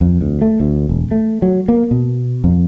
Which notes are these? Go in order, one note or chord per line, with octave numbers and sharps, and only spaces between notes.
F2
D2
A3
D2
E1
A3
F#3
A#3
B2
F2